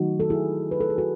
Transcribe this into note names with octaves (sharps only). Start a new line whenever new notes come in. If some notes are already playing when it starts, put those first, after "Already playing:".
Already playing: D#3 F#3 A3 D#4 F#4
A4
E4 G#4
B4
A4
G#4
F#4 A4